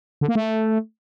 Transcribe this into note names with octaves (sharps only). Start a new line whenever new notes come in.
D3
A#3
A3